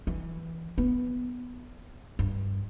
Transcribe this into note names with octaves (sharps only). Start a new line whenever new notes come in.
E3
B3
G2